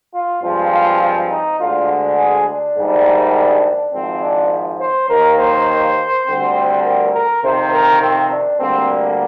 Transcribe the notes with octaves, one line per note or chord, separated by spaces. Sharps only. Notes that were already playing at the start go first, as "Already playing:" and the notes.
F4
G2 F3 G#3 C4 F4
F4
F4
D#4
D2 D3 G#3 F4
G#4
D4
A#1 G#2 D#3 G3
G#1 G#2 F3 C4
D4
C5
D#2 D#3 A#3 A#4
C5
D2 D3 G3 C4
A#4
A#4
F2 C3 D#3 C5
A#4
C4
D4
D2 D3 G3 A#3 C4